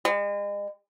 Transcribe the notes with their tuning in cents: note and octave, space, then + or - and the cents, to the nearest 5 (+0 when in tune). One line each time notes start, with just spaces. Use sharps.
G#3 -40